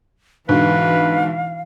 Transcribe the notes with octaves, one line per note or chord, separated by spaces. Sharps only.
G#2 B2 D3 E3 B4 F5